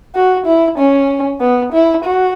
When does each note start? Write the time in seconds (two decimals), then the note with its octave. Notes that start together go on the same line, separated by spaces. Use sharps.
0.15 F#4
0.46 E4
0.78 C#4
1.40 B3
1.73 E4
2.04 F#4